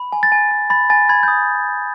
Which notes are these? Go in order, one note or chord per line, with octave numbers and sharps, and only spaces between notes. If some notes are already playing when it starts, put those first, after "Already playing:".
Already playing: B5
G#5
A6
G#5
G#5
B5 A6
G#5 A6
B5 G#6
D#6 G6